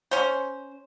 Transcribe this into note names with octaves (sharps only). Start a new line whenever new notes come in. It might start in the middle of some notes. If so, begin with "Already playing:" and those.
C#4 C5